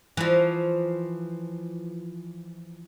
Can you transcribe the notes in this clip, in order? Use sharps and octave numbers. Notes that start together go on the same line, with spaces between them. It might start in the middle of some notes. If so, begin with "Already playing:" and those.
E3 F3